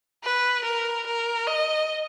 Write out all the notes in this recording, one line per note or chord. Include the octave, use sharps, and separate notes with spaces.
B4
A#4
A#4
D#5